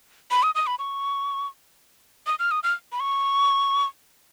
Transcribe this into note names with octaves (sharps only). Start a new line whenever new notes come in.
B5
D#6
D#6
B5
C#6
D#6
F6
D#6
F6
B5
C#6